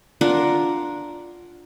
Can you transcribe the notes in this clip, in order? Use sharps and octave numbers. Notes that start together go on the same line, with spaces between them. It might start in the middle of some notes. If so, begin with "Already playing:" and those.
D4 F4 A#4 F#5